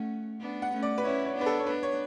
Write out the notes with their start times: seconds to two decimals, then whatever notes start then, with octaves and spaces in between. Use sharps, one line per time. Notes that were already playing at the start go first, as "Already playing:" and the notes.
Already playing: A3 C#4 F#5
0.40 B3 D4
0.62 F#5
0.72 A3 C#4
0.83 D5
0.98 B4
1.04 C#4 E4 C#5
1.25 C#5
1.35 B3 D4
1.41 B4
1.46 A4
1.59 C#5
1.67 B3 D4 B4
1.83 C#5